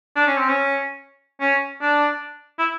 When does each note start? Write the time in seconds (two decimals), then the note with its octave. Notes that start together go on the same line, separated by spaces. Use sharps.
0.16 D4
0.27 C#4
0.38 C4
0.49 C#4
1.40 C#4
1.81 D4
2.59 E4